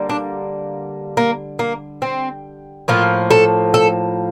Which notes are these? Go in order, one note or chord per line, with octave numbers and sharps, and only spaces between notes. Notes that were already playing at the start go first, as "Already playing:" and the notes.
Already playing: D3 G3 A#3
D4
A#3
A#3
C4
A2 F3 A#3 F4
A4
A4